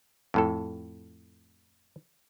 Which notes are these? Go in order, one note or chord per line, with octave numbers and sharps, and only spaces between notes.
F2 A2 A4